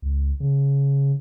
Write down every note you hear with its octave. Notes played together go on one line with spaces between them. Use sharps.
C#2
C#3